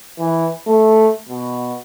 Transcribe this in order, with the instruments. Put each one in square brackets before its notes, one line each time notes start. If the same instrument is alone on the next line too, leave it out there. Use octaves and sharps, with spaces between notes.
[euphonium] E3
A3
B2